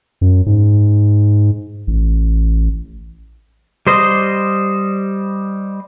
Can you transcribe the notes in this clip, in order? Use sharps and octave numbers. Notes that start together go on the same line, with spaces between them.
F#2
G#2
A1
G3 C5 D#5